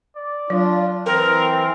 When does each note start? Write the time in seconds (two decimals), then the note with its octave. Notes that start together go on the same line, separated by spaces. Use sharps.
0.16 D5
0.50 F#3 D4 F4
1.06 E3 C4 A#4